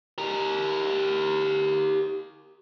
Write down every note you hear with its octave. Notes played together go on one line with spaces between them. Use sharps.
G4 A#4